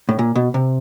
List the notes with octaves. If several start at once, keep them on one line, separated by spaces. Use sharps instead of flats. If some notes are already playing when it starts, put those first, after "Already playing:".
A2
A#2
B2
C3